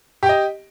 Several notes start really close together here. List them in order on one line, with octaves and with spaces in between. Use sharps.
G4 G5 D#5